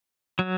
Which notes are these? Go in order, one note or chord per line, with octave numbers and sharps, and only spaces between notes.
F#3